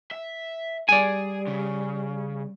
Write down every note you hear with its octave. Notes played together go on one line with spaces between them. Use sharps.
E5
G3 G#4 D5 G#5
C#3